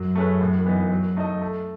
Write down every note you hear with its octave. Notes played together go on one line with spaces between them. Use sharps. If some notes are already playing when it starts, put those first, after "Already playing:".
Already playing: F#2 F#3
A3 C#4 G#4 B4
A2
E3 B3 D#4
F#3
A3 D#4 A4 D#5
A3